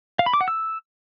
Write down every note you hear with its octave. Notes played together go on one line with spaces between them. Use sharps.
F5
B5
D6
F#5
E6